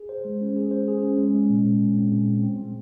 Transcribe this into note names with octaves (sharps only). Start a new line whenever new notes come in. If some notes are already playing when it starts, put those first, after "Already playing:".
Already playing: G#4
C5
G#3
C#4
G#4
C5
G#4
C#4
G#3
G#3
A#2
A#2
A#2
C4
A#2
C4
C4
G3